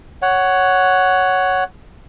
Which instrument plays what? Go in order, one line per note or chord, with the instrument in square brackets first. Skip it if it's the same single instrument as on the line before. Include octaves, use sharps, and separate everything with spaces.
[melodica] C#5 F#5